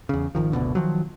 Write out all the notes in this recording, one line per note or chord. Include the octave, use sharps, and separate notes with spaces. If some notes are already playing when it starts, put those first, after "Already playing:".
E2 C#3
G#1 D#3 F3
F#1 D2 B2 D3
D#3 F3 F#3